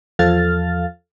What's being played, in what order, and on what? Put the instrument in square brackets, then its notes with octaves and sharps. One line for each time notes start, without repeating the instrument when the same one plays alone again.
[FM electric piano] E2 F3 A4 F5 F6 A6